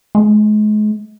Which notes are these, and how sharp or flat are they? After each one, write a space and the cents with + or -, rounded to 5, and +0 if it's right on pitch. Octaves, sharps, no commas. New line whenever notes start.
G#3 +35